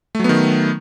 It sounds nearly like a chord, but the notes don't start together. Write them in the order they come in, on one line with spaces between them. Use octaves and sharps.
A3 F#3 B3 D#3